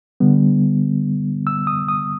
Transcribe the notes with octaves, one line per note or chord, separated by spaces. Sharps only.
D3 G3 B3
E6
D#6
D#6